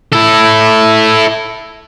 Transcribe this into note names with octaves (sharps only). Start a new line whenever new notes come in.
E4 A4